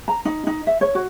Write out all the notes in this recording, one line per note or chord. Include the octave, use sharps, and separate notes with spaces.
A#5
D#4
D#4
E5
C#5
F#4